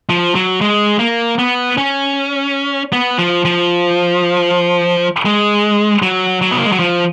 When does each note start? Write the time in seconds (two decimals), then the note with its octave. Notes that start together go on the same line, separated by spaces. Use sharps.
0.09 F3
0.35 F#3
0.61 G#3
0.99 A#3
1.39 B3
1.78 C#4
2.93 B3
3.18 F3
3.45 F3
5.25 G#3
6.02 F#3
6.41 F#3
6.51 B3
6.58 A#3
6.65 G#3
6.72 F#3
6.80 F3